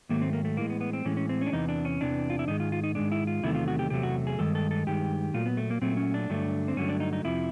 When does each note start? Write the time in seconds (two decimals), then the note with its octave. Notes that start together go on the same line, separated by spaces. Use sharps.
0.09 G#2 D#3 F#3 A3 A#3
0.21 C4
0.33 A#3
0.45 A3
0.57 A2 E3 G#3 A#3
0.70 B3
0.81 B3
0.93 C4
1.05 A2 E3 G#3 C#4
1.17 C#4
1.29 C4
1.41 C#4
1.46 D4
1.52 E2 C3 E3 D#4
1.69 D4
1.85 C#4
2.01 E2 C3 E3 D4
2.30 F4
2.39 E4
2.48 G#2 D#3 G#3 D#4
2.60 F4
2.72 F4
2.83 D#4
2.95 G#2 D#3 G#3 D4
3.12 E4
3.27 F4
3.44 E2 C3 D#3 F#3 A3 E4
3.55 F4
3.68 F#4
3.79 G4
3.90 E2 C3 F#3 A3 G4
4.03 F#4
4.27 G#4
4.39 G2 D#3 G#3 A4
4.55 A4
4.71 A4
4.87 G2 D#3 G#3 G4
5.34 A#2 F#3 A3 F4
5.46 B3
5.57 A3
5.70 A#3
5.81 A#2 F#3 A3 C4
5.97 C#4
6.14 D4
6.30 G2 D3 F#3 A3
6.68 C4
6.76 G2 D3 F#3 A3 C#4
6.89 D4
7.00 D#4
7.13 D#4
7.24 F2 C3 F3 E4